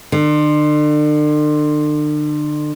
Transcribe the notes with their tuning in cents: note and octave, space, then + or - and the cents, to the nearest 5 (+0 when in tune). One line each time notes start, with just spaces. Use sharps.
D3 +40